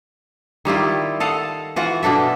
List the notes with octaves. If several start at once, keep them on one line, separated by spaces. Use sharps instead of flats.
D#3 G3 E4 F4
A4 D#5 F5 F#5
E3 F4 F#4 F#5
B2 D4 A4 E5